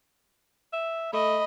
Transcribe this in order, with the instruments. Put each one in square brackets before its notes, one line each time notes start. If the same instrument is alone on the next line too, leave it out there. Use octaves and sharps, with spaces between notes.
[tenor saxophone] E5
[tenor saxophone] A3 [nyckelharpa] D#5 B5